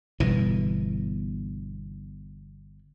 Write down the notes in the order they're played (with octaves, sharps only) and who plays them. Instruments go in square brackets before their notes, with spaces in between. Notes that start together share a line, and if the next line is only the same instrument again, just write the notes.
[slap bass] G1 B2 E3